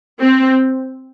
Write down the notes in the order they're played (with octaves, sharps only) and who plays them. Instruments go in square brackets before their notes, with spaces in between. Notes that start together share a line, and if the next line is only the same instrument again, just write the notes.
[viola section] C4